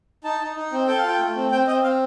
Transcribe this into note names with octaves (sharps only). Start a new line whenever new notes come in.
D#4 A5
D#4
D#4
C4
A4 G5
F5
F4 G5
A3
C4
C4 G5
C4 D#5
C4 F5